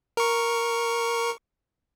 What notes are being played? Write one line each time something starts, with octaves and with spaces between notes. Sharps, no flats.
A#4 C#6